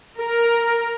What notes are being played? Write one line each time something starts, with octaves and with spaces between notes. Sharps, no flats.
A#4